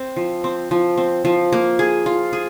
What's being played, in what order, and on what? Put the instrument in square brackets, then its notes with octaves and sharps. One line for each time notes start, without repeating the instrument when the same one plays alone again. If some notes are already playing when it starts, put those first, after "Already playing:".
Already playing: [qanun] C4
F3
C4
F3
C4
F3
A#3
G#4
F4
G#4